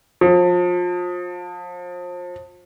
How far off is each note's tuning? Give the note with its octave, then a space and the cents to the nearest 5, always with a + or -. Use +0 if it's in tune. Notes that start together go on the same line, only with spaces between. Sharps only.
F3 +30